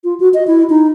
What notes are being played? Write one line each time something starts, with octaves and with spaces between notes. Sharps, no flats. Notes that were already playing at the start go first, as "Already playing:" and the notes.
F4
F#4
D#5
E4
D#4